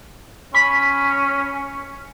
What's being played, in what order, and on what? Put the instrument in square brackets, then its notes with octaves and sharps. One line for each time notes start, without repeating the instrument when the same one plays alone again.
[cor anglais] C#4 [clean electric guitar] B5